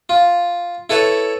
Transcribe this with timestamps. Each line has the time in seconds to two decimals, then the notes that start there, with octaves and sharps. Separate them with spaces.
0.09 F4
0.90 E4 A4 B4 C#5 E5